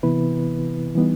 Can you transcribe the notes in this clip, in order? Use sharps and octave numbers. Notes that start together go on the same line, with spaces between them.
C3 E3 B3 E4 B4
E3 G3 B3 D#4